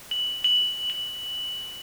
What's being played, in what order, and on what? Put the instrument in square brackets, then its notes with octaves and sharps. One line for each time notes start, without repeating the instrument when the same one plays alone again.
[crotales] F#7
F#7
F#7